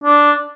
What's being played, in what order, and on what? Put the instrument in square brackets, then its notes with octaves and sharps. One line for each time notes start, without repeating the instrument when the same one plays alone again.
[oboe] D4